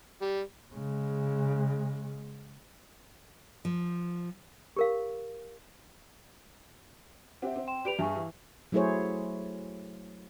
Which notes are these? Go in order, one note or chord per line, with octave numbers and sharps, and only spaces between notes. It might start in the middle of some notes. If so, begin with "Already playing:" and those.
G3
C#3 G#3
F3
G4 A#4 F5
C4 G4 E5 F#5
C4
G5 C6 E7
G4 B4 D5 D7 F7
G2 G#4 E5 G#5 C#6
E3
F#3 A3 E4 G#4 C5 C#5